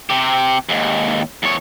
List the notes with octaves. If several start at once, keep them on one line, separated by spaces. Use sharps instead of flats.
C3 G4
D#2 G#2
E2 C#5